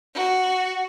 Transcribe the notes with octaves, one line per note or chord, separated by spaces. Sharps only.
F#4